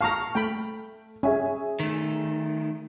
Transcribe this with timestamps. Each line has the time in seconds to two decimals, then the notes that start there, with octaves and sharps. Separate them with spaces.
0.01 F5 A5 A#5 C#6 F6
0.35 A3 G5 B5
1.23 C#4 G#4 E5 G#5
1.80 D#3 A3